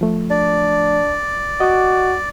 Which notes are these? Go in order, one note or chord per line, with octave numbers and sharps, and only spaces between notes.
F3 A3
D4 D5
F#4 D#5 D6